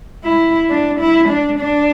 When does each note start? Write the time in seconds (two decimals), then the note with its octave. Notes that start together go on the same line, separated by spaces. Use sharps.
0.24 E4
0.70 D4
1.00 E4
1.29 D4
1.59 D4